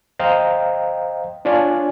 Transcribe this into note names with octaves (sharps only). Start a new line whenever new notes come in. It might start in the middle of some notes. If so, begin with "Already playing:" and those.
C5 D#5 F5 G5 A#5
D4 F4 C#5 D5 G#5